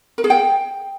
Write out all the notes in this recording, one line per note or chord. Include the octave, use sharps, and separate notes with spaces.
A#4
G#4
G5